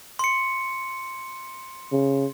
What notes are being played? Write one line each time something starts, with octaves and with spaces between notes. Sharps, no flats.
C6 C#7
C#3